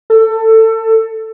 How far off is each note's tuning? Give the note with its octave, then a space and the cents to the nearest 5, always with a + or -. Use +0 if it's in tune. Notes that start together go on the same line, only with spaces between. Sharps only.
A4 +20